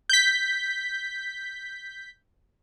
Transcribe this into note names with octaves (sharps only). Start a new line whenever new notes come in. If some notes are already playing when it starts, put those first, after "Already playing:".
G6 B6